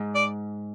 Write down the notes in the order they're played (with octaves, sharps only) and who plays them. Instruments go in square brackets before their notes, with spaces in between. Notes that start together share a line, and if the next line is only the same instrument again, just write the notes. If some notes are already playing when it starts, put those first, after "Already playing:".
Already playing: [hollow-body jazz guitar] G#2
[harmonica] D5